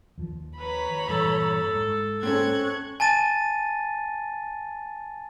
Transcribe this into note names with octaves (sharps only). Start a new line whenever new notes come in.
D#2 F3
B4 C#5 A#5 B5
G2 A#2 E3 A4
G#2
C4 C#4 A4 C#6 F#6 G#6
G#5 A5 A6 D#7